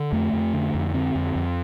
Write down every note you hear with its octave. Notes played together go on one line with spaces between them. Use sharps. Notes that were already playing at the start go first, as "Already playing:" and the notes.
Already playing: D3
F2 A3
F2
D3
F2
D3 C4
F2
F2